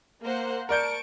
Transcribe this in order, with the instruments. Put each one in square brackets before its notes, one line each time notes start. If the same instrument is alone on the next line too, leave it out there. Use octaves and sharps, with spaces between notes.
[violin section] A#3 C5 F#5
[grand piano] A#4 D5 G6 [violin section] A5 C#6 D7